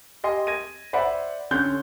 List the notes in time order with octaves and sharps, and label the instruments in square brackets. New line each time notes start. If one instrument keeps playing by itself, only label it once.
[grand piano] G4 D#5 G#5 C6
G#6 A#6 D#7
C5 D5 E5 F#5 B5
D3 C#4 C6 F#6 G6